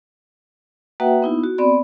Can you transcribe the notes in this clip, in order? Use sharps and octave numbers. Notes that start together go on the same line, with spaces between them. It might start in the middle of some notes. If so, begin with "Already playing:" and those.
A#3 F#4 B4 E5 F#5 G5
B3 D#4 E4
F#4
B3 C4 D5 B5